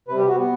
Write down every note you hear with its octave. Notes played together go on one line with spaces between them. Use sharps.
C3 G3 B4
G4
F#4
B3